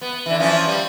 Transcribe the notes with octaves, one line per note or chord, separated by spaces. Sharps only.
B3
D3 E3
E3 F3 C#4
G3